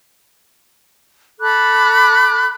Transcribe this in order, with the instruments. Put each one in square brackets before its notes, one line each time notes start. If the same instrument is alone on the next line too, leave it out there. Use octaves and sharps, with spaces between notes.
[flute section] A4 B5 D6 F#6